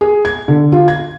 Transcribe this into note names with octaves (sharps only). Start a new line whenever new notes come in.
G#4
G#6
D3
F4
G#6